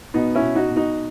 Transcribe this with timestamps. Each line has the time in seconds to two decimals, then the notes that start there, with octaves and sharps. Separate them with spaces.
0.14 B2 B3 D#4
0.35 C#4 E4
0.41 B2
0.55 D#4 F#4
0.69 B2
0.76 D#4 F#4